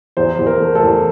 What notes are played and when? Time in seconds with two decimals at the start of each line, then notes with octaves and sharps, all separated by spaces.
0.17 E2 C5
0.39 E2
0.47 A#4
0.60 A3
0.75 A4
0.83 E2